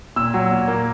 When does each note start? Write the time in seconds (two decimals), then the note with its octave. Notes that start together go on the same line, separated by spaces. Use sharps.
0.16 A#2 E6
0.34 F#3
0.51 A#2
0.68 A#3